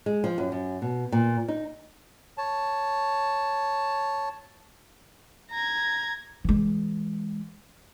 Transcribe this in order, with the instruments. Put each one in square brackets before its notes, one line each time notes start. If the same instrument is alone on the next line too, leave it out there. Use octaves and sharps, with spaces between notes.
[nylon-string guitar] G#3
F3
F#2
F#2
B2
A#2
D#4
[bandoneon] C#5 A5
[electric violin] A#5 G#6
[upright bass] E3 G#3